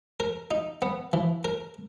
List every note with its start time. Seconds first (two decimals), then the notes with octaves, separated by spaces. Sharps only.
0.20 A#4
0.51 D#4
0.82 B3
1.13 E3
1.45 A#4